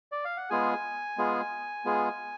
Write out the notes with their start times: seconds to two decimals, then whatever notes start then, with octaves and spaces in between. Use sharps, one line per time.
0.12 D5
0.25 F5
0.37 F#5
0.50 G#3 B3 F4 G#4 G#5
1.18 G#3 B3 F4 G#4
1.85 G#3 B3 F4 G#4